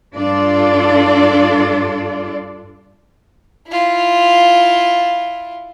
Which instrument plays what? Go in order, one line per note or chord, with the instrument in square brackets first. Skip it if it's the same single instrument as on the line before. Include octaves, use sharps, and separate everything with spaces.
[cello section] G2 D4 F4 A4 D5
[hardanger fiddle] E4 F4